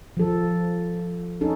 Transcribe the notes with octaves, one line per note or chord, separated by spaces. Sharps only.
F3 A4
C#4 D#4 A4